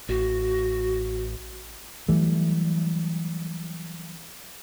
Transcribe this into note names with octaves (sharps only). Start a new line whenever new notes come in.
A1 F#4
E3 F#3 G3 A3